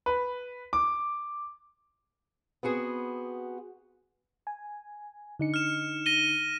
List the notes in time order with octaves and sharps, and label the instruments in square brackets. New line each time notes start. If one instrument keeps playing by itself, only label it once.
[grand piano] B4
D6
[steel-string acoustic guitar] B3 C4 F#4 G#4
[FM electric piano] G#5
D3 D#4 C#7
[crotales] F6 E7
A#6 D#7 G7